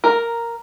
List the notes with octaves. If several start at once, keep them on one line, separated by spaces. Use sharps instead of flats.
A#4